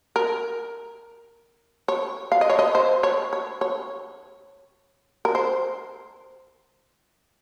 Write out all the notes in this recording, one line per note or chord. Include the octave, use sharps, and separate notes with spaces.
A#4
C#5
F5
D#5
C#5
D#5
C5
C#5
C#5
C#5
A#4
C5